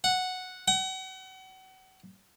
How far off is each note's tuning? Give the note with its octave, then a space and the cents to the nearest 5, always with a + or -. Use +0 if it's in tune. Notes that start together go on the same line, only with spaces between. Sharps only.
F#5 -5
F#5 +35